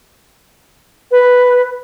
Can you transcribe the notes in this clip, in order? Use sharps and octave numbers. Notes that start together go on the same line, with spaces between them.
B4